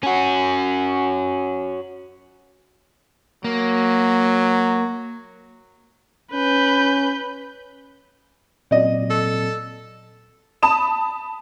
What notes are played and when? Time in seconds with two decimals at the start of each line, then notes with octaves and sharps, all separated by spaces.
0.03 C#4 F#4
3.45 F#3 A#3
6.33 C#4 B4 G6
8.71 A#2 F#3 C4 D5 D#5
9.10 A4
10.63 A5 B5 D#6 E7